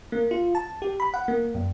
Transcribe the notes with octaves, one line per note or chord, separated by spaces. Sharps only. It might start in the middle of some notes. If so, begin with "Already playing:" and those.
A#3
F4
A5
G4
B5
F#5
A#3
F#2